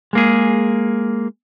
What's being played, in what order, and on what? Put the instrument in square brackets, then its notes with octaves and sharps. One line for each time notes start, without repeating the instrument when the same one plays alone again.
[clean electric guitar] G#3 A#3 G#4